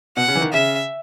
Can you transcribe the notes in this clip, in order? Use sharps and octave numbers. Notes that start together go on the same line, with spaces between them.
B2 F#5
C#3
E3
D#3
C#3 E5